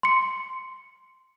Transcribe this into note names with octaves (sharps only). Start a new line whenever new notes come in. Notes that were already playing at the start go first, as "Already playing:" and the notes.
C6 C#7